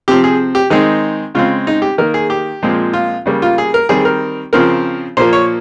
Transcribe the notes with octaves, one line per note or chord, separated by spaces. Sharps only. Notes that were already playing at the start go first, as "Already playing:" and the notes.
C3 F3 C4 G4
G#4
G4
D#3 G#3 C4 D#4
C#3 G#3 C4 F4
D#4
G4
D#3 A#3 A#4
G#4
G4
A#2 F3 G#3 C4
F4
C#3 G3 A#3
F4
G#4
A#4
D#3 G3 C4 G#4
A#4
C#3 F3 C4 A#4
A#2 F3 A#3 C5
C#5